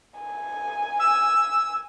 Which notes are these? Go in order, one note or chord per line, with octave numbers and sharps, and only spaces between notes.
G#5
E6